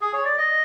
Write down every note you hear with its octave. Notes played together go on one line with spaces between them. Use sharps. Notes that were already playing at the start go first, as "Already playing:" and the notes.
G#4
C#5
D5
D#5